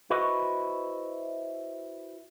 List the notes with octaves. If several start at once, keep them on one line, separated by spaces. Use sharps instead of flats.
E4 F#4 B4 C5 D#5